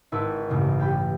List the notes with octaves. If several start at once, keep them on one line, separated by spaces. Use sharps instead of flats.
G#1 E4 B4 C#6
A1 G2 C#3 E3
G4 G5 B5 D6